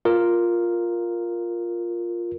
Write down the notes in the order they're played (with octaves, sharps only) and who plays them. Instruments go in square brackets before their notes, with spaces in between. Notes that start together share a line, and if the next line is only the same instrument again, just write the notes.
[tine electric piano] F4 A#4